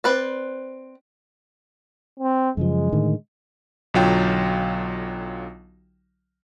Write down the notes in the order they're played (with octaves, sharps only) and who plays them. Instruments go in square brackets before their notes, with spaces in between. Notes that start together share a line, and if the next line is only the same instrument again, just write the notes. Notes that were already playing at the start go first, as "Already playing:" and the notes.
[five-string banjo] C4 B4 D5
[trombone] C4
[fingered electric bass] F#2 C#3 F3 [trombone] G#3
[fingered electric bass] A2 D3 D#3
[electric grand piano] B1 D3 F#3 F4 G5